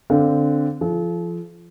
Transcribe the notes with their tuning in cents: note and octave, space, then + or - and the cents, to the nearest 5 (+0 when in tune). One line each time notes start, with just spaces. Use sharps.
D3 +0 C4 -10 F5 +0
F3 -20 A4 -40